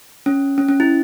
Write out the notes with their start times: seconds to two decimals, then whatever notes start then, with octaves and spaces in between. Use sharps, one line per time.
0.26 C#4
0.58 C#4
0.68 C#4
0.80 E4